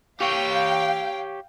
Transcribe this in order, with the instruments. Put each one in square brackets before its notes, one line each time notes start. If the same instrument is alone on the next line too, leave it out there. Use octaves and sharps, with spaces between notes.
[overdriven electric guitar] G4 C#5 [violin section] F5 G5